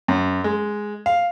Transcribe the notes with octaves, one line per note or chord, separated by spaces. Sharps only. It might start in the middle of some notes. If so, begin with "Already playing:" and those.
F#2
G#3
F5